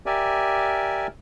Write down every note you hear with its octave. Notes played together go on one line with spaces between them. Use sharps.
G4 A#4 D5 E5 G#5